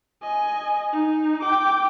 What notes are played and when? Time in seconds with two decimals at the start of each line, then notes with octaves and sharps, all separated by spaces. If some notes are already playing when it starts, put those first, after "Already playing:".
0.23 D#5 G#5
0.92 D#4
1.41 G5 D6